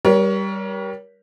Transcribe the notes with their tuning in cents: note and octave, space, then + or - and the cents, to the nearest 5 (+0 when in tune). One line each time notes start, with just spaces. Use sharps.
G3 +0 A#4 +35 C#5 +25